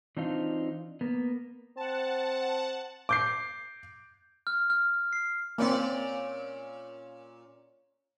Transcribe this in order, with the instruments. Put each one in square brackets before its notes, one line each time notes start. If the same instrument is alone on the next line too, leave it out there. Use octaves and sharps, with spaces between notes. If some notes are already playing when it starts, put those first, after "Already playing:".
[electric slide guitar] E3 C4 D4 D#4 F4
A#3 B3
[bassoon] C4 [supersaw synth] F#5 A5
[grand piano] D6 G6 C7
[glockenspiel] F6
F6
C7
[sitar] A#2 C#4 D5 [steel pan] A#3 C4